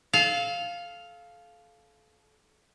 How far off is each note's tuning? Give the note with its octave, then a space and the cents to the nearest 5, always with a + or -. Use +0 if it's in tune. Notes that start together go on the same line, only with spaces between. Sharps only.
A4 -30 F5 +0